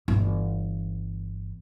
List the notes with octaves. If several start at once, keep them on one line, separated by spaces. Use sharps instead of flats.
G1 E3